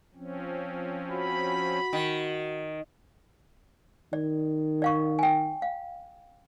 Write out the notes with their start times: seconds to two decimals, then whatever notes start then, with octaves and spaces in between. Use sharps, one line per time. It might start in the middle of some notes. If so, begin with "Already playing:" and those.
0.15 F3 C4 C#4
1.11 F#4 B5
1.93 D#3
4.13 D#3 D5
4.82 D5 F5 C#6
5.19 G5 G#5
5.62 F5